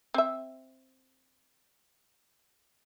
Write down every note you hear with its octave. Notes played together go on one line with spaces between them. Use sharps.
C4 E5